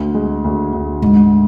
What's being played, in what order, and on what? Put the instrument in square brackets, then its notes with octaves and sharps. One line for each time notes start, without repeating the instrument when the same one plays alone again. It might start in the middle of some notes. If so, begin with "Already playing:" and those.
Already playing: [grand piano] D2 [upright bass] A3
[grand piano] G#3
D2
D2
[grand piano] G#2 [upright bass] G#3